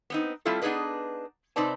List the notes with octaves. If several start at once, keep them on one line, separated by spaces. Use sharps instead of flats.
B3 C4 D#4
G3 A3 C4 E4 F4 A4
B3 D4 D#4 G#4 B4 D#5
C3 C4 D#4 B4 D5 A5